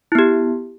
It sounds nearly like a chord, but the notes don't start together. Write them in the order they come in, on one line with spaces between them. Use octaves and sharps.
E4 B3 G4